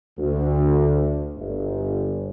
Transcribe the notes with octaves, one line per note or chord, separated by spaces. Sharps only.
D2
G1